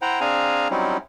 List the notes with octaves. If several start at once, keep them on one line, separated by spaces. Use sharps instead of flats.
E4 C5 F#5 G5 A#5
C4 D4 G#4 F5 G#5 A#5
F#3 G3 C4 C#4 D#4 E4